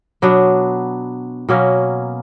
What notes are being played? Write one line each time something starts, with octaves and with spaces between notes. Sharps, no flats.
B2 F#3 B3 D4
B2 F#3 A#3 C#4